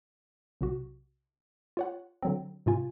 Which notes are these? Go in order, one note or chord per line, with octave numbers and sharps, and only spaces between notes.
B1 C3 F#4
F4 C#5 F#5
D3 F#3 C4
G#2 C3 F4 G#5